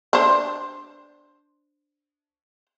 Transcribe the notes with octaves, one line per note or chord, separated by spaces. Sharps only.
D4 C5